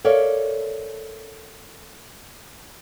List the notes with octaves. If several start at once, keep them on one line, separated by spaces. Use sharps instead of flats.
A4 A#4 C#5 D5 E5 F5